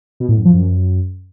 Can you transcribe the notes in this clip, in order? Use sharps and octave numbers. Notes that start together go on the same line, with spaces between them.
B2
A2
F#2
F3
F#2